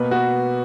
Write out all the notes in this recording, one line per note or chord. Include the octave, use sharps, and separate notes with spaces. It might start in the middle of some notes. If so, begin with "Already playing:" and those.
Already playing: B2 A#3 B4
B3 F#4